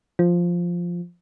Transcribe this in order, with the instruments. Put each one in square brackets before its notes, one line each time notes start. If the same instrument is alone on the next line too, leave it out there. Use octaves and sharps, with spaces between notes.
[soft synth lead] F3